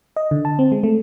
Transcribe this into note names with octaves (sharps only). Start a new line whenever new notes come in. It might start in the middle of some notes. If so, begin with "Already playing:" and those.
D#5
D3
A5
C4
G#3
A3